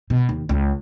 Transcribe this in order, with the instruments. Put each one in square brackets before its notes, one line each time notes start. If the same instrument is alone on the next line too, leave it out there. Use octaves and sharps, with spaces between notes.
[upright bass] B2
D#2
C#2